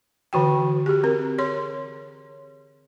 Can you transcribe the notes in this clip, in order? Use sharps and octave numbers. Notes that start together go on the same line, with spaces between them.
D3 E3 F#4 G5
G4 G#4
C4 A#4
G#4 C#5 C6